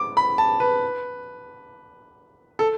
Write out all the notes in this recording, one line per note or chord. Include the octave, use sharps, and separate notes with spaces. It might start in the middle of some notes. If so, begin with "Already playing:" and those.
Already playing: D6
B5
A5
B4
A4